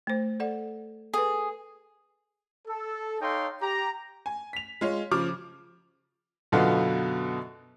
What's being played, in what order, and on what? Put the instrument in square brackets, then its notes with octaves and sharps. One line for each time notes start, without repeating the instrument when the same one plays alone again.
[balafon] A3 C5
A4 D5 F#5
[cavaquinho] G#4 [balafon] A4 B4
[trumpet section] A4
D#4 A4 C#5 F5 G5 C6
G4 A#5
[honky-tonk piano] G#5
B6 F7
G#3 F4 C#5
C#3 F3 D6 F6
[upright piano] F#2 B2 D3 B3 F4 F#4